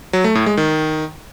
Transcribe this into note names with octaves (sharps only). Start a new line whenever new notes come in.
F#3
A3
A2
G#3
D#3